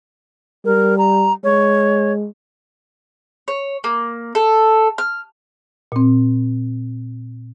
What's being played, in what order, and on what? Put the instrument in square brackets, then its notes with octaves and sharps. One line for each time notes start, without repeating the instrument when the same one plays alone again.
[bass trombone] G3 [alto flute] A#4
[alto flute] A#5
[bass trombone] G#3 [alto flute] C#5
[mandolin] C#5
A#3
A4
F6
[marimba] A#2 C4